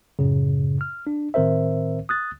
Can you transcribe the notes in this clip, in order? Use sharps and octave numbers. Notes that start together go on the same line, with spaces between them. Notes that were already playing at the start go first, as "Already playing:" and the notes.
F#2 A2 C#3
F6
D4
A2 D#3 C4 A#4 C5 E5
D#6 F#6 A6